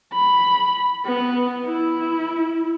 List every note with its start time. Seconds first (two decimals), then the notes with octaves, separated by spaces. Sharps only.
0.13 B5
1.05 B3
1.64 E4